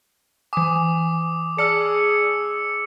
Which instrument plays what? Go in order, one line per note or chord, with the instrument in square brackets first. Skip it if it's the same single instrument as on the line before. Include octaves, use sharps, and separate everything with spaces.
[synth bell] E3 G#5 [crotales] D6 D#6
[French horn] G#4 [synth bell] D5 A5 F6 [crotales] E6 C#7